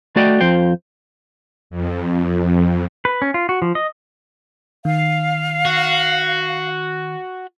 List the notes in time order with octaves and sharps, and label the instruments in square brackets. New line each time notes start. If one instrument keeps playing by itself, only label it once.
[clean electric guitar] A3 F#4 D5 D#5 G5
F2 F3 C5 G5
[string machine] F2
[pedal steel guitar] B4
C#4
F4
F#4
F3
D#5
[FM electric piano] D#3 [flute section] F5
[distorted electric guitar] F#4